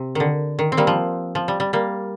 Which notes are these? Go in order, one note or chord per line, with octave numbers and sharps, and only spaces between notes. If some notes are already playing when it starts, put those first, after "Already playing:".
Already playing: C3
D3 D#3
D#3
C4
G3 A#3
F3
F3
G3
G3
G3 A#3